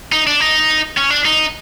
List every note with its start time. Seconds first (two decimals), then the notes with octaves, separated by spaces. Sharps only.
0.12 D#4
0.27 D4
0.40 D#4
0.97 C#4
1.10 D4
1.25 D#4